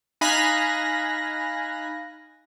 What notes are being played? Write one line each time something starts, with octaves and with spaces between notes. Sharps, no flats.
D#4 F5 G#5 B5 F#6 A#6